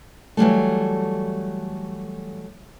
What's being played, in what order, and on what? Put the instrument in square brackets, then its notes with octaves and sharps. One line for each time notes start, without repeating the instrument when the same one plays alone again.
[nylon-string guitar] E3 F#3 G3 A3